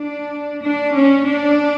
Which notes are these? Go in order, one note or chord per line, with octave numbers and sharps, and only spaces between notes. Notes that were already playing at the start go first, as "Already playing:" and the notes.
Already playing: D4
D4
C#4
D4